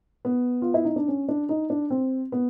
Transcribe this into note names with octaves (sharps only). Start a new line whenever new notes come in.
B3
F4
E4
D#4
D4
C#4
D4
D#4
D4
C4
B3